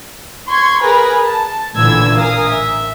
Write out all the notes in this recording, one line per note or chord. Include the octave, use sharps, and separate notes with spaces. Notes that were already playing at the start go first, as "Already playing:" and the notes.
C6 C#6 G#6
G#4 A#4 B4 G#5 A#5 B5
A5
A1 A#2 D3 E3 E6 G#6
A#4 F5 G#5 D#6
E5